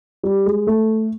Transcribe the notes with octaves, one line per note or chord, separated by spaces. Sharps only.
G3
G#3
A3